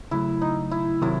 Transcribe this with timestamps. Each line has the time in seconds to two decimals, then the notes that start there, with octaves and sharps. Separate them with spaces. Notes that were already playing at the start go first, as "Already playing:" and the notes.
0.11 C#3 F#3 A3 E4
0.41 D#4
0.71 E4
1.02 C3 D#3 F#3 C4 E4